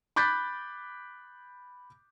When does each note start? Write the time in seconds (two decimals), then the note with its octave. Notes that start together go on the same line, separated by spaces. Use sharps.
0.16 B5 D6 F#6 G6 A6 B6